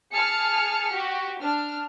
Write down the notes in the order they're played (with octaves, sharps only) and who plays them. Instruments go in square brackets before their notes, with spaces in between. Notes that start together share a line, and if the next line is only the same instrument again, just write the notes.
[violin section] G#4 A5 F6 C#7
F#4 G4
D4 F6